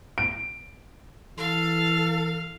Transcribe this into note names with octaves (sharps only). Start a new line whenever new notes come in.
D7
E3 A4 F5